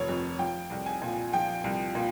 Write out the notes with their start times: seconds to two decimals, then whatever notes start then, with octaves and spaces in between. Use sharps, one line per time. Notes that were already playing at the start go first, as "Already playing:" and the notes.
Already playing: F1 D#3 C#5
0.09 F2
0.39 F3 G5
0.70 C2
0.86 G#5
1.02 A#2
1.33 F3 G5
1.64 C2
1.95 A#2